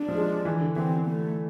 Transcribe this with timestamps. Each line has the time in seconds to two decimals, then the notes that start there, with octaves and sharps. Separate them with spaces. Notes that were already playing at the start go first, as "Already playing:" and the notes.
Already playing: D4
0.08 F3
0.15 G#3
0.45 E3
0.61 D3
0.76 E3 C4
1.07 A3